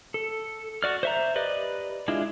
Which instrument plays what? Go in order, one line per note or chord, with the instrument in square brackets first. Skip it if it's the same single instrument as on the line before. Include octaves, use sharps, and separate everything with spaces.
[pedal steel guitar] A4
F#4 D5 F6
C5 E5 A#5
G4 B4 D5 D#5
G#3 D4 E4 F4